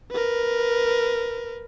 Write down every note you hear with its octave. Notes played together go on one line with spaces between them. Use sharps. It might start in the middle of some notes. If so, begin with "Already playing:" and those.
A#4 B4